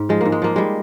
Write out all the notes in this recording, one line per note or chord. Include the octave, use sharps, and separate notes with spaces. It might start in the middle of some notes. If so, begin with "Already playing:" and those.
Already playing: G#2
F3 G#3
G#2 A#3
G#3
F3 A#3
G3 G#3